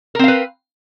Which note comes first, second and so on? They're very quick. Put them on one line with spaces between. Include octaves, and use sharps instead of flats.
A#4 C4 F5 B4